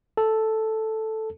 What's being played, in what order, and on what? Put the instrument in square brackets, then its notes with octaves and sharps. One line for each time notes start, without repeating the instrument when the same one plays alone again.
[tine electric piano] A4